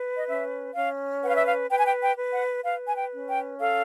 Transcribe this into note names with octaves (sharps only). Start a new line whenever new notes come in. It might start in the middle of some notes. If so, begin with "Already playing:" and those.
Already playing: B4
D#5
C#4 E5
C#4 F5
B4 F#5
F5
E5
F5
B4 G5
G#5
G5
G5
B4
F#5
B4 F5
G#5
G5
C#4
G5
A4 F5